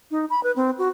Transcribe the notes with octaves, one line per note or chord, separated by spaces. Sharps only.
D#4
B5
B4
C4
F#4